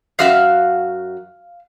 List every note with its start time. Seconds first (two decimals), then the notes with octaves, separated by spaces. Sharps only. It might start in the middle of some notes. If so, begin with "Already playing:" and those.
0.19 F#2 F#4 E5 F5 F6 F#6